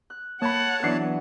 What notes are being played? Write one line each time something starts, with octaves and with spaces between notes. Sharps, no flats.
F#6
A#3 C#5 F#5 A5 B5
E3 F#3 B3 D4 F#6 C7